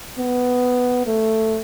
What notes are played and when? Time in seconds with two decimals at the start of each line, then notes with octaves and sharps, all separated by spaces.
0.18 B3
1.07 A3